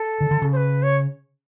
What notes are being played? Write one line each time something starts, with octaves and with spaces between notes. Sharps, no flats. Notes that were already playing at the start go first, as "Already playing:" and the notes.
Already playing: A4
D3
D3
C#3
C5
B4
C#5